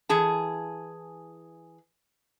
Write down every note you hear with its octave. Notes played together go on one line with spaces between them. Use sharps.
E3 G#4 A5